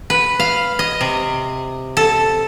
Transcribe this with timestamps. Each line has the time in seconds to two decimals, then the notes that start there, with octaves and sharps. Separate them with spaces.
0.10 B4
0.40 F5
0.79 D#5
1.01 C3
1.97 A4